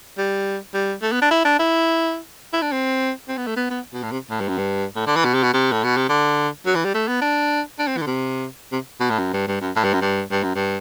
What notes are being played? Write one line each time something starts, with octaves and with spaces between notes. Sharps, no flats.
G3
G3
A3
B3
D4
E4
D4
E4
E4
D4
C4
C4
B3
A3
B3
B3
B2
A2
C3
A2
G2
F#2
G2
A2
D3
E3
B2
C3
B2
C3
A2
B2
C3
D3
F#3
E3
G3
A3
B3
D4
D4
C4
E3
D3
C3
C3
B2
A2
F#2
G2
G2
F#2
A2
G2
F#2
G2
G2
F#2
G2